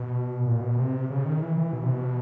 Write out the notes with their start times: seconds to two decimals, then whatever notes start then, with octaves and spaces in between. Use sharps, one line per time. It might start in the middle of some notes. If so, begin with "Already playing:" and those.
Already playing: B2
0.46 A#2
0.61 B2
0.77 C3
1.10 C#3
1.25 D#3
1.42 E3
1.58 E3
1.73 B2
1.83 C3
1.93 B2